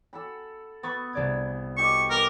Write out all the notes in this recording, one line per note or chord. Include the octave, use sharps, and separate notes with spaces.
A4 F#5 B5
B3 B5 C#6 A6
C2 D5 G#6
G4 A4 D#5 C#6
B3 A#4 C#6 D6